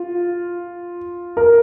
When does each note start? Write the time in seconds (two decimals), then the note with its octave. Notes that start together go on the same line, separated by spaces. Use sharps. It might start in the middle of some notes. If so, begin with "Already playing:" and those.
Already playing: F4
1.37 A#4